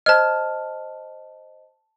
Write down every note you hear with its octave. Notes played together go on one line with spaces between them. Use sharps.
C5 D#5 A5 F6